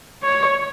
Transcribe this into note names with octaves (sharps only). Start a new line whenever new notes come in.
C#5